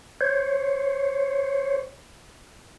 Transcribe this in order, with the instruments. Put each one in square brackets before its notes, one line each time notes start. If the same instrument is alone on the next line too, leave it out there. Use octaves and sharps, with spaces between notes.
[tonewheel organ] C5 C#5